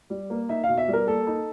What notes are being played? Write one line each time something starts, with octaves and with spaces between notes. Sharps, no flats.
G3
A#3
D#4 E5
B2 F5
E5
G3
A#4
A#3 A4
D#4